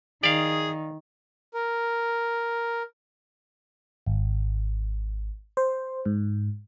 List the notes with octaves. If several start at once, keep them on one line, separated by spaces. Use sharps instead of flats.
D#3 G#4 D5 F5
A#4
G#1
C5
G#2